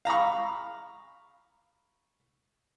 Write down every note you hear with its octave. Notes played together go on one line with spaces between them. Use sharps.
F5 A#5 B5 C#6